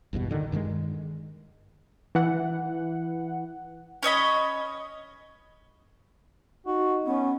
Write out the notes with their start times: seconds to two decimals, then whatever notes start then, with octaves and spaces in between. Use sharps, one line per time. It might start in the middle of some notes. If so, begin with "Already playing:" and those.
0.13 G#1 E2 G2 B2
0.30 A#2 D3 D#3
0.52 G2 D#3 E3 G#3
2.15 E3 F#5
4.03 C#4 C#5 D#5 B5
6.67 D#4 F#4
7.06 B3 C#4